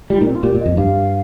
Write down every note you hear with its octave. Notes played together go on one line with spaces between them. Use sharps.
G3 F4
D#4
A#2
C4
F4
A#2 G4
A#2
D#5
F2
G2 F5